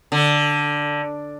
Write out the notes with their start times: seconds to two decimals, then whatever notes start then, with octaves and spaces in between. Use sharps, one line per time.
0.12 D3